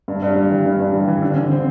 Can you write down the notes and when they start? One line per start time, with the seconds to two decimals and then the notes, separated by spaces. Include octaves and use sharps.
0.08 G2
0.22 G2
0.36 G3
0.50 E3
0.66 G2
0.80 G2
0.93 G3
1.08 E3
1.22 D3
1.36 D3
1.51 C4